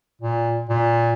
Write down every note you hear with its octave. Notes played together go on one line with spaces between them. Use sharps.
A#2
A#2